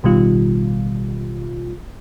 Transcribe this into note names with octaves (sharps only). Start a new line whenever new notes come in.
A1 B2 D#3 G3 F4